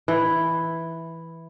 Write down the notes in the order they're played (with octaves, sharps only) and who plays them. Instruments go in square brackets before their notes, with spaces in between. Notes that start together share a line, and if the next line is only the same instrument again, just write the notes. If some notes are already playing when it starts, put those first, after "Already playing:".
[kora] E3